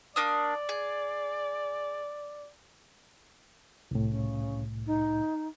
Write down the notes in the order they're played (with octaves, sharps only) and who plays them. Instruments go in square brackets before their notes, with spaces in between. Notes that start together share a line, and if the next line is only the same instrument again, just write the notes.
[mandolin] A#3 D4 D#6 [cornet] D5
[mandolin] G#4
[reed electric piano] C2 A2
[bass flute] C#3
D#4